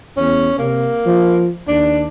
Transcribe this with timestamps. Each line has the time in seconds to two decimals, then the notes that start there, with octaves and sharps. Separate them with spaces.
0.17 E2 C#4
0.59 C3 A#3
1.06 F3
1.68 D#2 D4